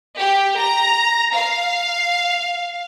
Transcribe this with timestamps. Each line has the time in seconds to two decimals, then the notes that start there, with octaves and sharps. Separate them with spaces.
0.19 G4
0.60 A#5
1.35 F5